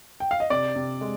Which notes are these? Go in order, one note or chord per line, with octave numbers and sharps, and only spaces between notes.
G5
F5
D#5
C3 D5
C3
G#3